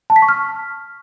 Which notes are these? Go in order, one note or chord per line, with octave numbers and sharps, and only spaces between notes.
A5
B6
C#6
F6